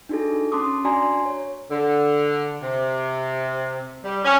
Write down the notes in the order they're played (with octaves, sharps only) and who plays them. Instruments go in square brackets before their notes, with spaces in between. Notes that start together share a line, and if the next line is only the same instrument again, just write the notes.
[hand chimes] D4 D#4 F#4 G#4 A4
C#4 A5 C6 D6 D#6
D4 F#4 D5 G#5 A#5 C6
C#5
[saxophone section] D3
C3
G3
C#4